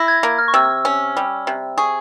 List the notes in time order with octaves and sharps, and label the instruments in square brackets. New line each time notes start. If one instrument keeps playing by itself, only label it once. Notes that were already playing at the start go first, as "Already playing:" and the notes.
Already playing: [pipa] E4 [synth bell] A#6
[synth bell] G#6
[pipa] A#3
[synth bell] F6
C#6
[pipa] C3 [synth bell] E6
[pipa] C#4
G3
C3
[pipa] G#4 [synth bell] C#6